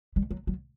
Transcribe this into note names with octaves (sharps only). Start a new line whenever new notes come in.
G3
F#3
F#3